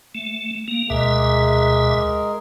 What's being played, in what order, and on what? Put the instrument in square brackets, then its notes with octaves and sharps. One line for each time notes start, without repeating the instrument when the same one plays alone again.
[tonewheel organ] A3
A#3
[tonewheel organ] D2 B2 E5 [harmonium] G#3 G#4 A#4